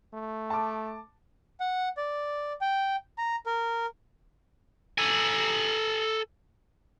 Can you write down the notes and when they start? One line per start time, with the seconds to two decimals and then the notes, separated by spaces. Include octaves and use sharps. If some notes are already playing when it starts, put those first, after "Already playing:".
0.14 A3
0.50 A5 D6
1.60 F#5
1.97 D5
2.61 G5
3.18 A#5
3.46 A#4
4.98 A4 G#5